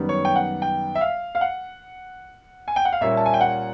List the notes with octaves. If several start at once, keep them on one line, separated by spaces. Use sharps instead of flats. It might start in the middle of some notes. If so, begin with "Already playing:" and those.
Already playing: F#2 D#3 G3 B3
C#5
G5
F#5
G5
E5
F5
F5
F#5
G#5
G5
F#5
F5
A#2 G3 A#3 C#4 E5
A5
G#5
G5
F#5